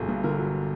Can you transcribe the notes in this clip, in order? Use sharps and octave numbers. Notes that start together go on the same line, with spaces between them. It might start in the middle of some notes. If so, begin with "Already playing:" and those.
Already playing: G1 D3 F#3 G#4
G2
D3 A#4
F#3